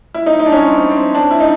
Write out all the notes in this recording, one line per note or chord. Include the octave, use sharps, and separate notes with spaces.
E4
D#4
D#4
D4
C#4
C4
C4
D4
E4
D#4